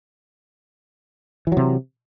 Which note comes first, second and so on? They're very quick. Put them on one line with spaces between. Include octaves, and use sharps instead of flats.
E3 F#3 C3